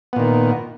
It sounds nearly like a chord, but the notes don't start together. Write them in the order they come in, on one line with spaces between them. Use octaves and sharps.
B3 A#2 D#3